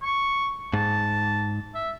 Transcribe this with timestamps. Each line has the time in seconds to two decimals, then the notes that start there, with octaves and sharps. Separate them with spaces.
0.02 C#6
0.73 G#2 A5
1.75 E5